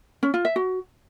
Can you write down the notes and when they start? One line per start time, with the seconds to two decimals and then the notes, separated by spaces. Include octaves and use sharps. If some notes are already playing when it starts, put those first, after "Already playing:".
0.23 C#4
0.34 F4
0.45 E5
0.56 F#4